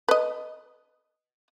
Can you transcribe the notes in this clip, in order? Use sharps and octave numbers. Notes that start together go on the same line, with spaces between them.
B4 D#5